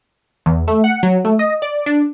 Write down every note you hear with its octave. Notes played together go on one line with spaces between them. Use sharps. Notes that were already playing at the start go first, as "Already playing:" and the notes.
E2
A3
F#5
F#3
A3
D#5
D5
D4